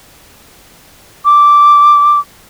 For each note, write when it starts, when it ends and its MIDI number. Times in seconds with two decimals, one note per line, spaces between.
1.25 2.19 86